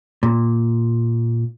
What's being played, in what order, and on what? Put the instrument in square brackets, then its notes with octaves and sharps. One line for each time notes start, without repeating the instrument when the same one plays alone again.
[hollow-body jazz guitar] A#2